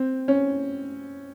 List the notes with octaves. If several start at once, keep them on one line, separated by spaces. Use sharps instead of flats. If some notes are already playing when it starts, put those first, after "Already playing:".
Already playing: C4
C#4